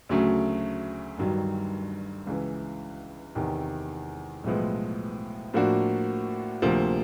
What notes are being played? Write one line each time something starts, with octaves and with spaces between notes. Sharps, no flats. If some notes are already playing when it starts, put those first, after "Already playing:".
D2 C#3 F#3 A3
G1 G2 D#3 F#3
C#2 C#3 E3
E2 C3 D#3
B1 A2 F3 G#3 B3
A2 F3 A#3 D4 F#4
D2 C3 F3 A#3